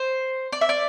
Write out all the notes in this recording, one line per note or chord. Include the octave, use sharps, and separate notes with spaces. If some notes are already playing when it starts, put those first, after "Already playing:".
Already playing: C5
D5
E5
D5